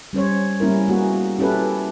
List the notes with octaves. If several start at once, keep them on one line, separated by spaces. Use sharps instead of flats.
G3 C#4 C5 C#5
G3 A#3 C#4 E4 A#4
A#3 B3 F#4 G#4
C#4 E4 G4 A4 B4